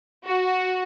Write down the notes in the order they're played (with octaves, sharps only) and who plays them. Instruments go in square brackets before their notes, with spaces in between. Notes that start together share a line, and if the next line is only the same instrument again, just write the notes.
[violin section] F#4